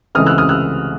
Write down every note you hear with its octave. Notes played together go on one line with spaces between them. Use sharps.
C#2 C#3 E3 A3 C4 D#6 F6
E6 F#6
D#6 F6
E6 F#6